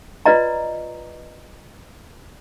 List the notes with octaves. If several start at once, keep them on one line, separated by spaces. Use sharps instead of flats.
F4 B4 D5 D#5 A#5